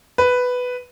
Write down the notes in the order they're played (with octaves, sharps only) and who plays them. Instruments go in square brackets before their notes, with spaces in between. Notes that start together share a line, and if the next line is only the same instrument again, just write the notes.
[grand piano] B4